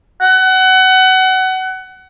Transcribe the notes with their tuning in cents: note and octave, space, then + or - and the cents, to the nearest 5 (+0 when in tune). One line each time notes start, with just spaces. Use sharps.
F#5 +25